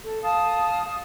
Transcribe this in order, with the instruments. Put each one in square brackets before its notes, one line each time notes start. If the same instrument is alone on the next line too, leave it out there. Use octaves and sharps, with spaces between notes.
[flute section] A4
[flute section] F5 A5 [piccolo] D#6